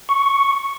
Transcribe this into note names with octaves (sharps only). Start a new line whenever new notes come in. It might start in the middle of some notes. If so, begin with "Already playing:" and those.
C#6